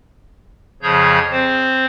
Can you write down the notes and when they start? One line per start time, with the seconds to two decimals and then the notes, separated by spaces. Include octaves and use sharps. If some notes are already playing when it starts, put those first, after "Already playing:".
0.82 F2 C#3 F3 G#4 C#5 G6
1.31 C4 C5